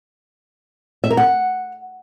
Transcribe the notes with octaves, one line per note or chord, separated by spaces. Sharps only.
E5
A#4
F#5